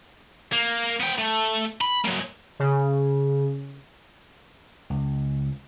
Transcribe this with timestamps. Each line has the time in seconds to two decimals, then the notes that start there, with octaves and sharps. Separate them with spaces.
0.52 A#3
1.00 B3 G5
1.18 A3
1.81 B5
2.05 F#3 A#3
2.60 C#3
4.90 C#2